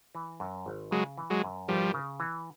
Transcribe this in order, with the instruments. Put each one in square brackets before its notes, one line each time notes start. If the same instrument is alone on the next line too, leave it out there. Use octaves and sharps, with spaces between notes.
[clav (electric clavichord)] E3
F#2
G#1
[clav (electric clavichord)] C#3 [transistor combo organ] F#3 G#3
[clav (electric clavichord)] E3
[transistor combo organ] F#3 G#3
[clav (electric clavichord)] F#2
[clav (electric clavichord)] G#1 [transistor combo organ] F3 G3
[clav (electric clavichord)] C#3
E3